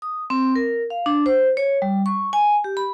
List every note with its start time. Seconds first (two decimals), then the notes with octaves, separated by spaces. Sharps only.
0.02 D#6
0.30 C4
0.55 A#4
0.90 F5
1.06 D4
1.26 C5
1.57 C#5
1.82 G3
2.06 C#6
2.33 G#5
2.64 G4
2.77 B5